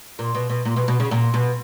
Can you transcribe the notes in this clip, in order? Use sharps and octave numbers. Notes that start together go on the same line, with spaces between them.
A#2
B2
B2
A#2
B2
B2
C#3
A#2
B2